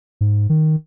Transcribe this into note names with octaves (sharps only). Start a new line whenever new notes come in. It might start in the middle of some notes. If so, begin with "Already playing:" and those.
G#2
D#3